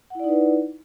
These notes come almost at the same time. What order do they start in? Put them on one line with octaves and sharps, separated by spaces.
F#5 E4 D5 D#4 B4